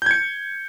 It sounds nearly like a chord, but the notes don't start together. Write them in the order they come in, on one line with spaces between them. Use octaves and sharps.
G6 G#6 C#7